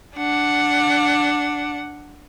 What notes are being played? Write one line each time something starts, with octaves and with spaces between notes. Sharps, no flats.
D4 F#5